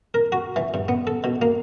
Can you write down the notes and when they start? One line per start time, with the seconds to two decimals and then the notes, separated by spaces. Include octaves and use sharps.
0.14 A#4
0.32 F#4
0.56 E3
0.74 G2
0.88 B3
1.07 A4
1.24 B2
1.42 A#3